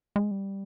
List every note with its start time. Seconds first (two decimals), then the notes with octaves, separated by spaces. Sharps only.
0.16 G#3
0.31 G3